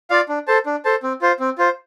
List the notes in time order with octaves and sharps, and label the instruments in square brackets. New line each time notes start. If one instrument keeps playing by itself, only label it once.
[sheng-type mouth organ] F4 D5 F5
D4
A4 C5 A5
D4
A4 C5 A5
C4
F4 C5
C4
F4 C5